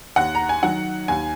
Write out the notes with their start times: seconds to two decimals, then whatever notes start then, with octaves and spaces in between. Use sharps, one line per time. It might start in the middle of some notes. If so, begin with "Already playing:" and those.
0.16 D#2 F#5
0.35 A#5
0.49 G#5
0.63 D#3 F#3 F#5
1.08 D#2 G#5